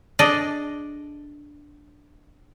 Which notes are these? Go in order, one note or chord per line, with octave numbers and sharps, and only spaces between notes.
D4 G#4 A4 D5 D#5